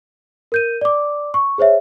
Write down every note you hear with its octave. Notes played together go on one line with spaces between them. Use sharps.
A#4 G6 D#7
D5 D6
C#6
G#4 C5 C#5 E5